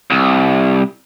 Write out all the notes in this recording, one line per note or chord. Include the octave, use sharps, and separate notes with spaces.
C2